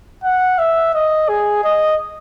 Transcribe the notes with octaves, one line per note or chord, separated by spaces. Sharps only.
F#5
E5
D#5
G#4
D#5